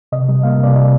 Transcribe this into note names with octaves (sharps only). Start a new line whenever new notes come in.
C3 D#5
G3
A#3 F5
C3 D5
C3 D#5